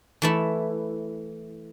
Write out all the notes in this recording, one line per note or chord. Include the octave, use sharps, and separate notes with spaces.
E3 A3 E4